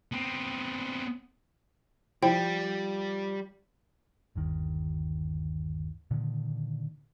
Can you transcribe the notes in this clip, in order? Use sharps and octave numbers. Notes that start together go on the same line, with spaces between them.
B3 C4
F3 G3 E4 C5 G5
G1 D#2 D#3
A#2 D3 D#3